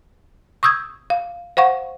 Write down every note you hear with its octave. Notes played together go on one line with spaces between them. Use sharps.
C#6 D#6 E6 G6 G#6
F5
C5 F5 F#5 C#6